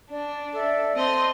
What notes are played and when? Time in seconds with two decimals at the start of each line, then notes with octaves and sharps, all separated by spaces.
0.10 D4 D5
0.53 A4 D5 E5
0.95 C4 D#5 A5 C6